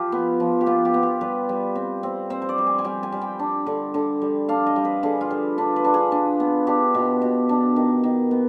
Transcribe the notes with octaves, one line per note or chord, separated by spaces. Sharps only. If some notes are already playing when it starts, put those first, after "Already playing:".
Already playing: F3 F4 G4
B3
F3
G4
B3 F4
G4
B3
G4
G3 B4
G3
C4
C4
C4 C5
C5
D5
G3
G#5
G#5
G3 G5
G#5
G3
G5
D4
D3
D3
G3
D4 F5
D#5
G3
B4
D3 G#4
F4
G3
D4 B4
B4
D4
G#4
D4
B3
D4 G4
B2
B2
D4
D#3
D#3
B3